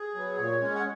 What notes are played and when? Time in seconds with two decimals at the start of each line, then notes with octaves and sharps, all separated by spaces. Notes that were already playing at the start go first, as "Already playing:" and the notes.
Already playing: G#4
0.15 F#3 B3
0.37 A#2 C#5
0.60 G#3 C#4
0.75 F#5